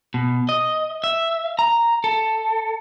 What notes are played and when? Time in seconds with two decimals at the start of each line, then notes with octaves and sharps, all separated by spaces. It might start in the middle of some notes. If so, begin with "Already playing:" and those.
0.14 B2
0.49 D#5
1.04 E5
1.59 A#5
2.04 A4